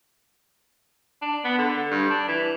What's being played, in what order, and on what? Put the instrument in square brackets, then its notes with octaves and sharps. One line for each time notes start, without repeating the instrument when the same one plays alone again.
[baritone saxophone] D4
B3
D3
G2
D4
E3